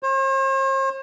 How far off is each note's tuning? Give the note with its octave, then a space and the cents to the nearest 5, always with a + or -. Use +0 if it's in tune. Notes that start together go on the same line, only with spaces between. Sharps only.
C5 +45